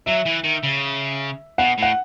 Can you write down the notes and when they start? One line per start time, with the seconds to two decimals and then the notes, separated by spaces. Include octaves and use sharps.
0.06 F#3 E5
0.25 E3
0.44 D#3
0.64 C#3
1.58 B2 F#5
1.78 A2 F#5